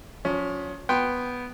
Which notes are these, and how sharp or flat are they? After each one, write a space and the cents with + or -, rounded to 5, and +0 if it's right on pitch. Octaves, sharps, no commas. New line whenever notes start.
F3 +40 C#4 +20
B3 +0 G5 -5 C6 +0